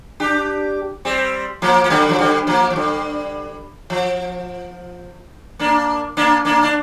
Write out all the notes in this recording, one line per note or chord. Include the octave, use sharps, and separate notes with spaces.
D4 G4
G3 C4
F3 A#3
A#3
D3 G3
F3
D3 G3
F3 A#3
F3
D3 G3
F3
A#3 D4
A#3 D4
A#3 D4
D4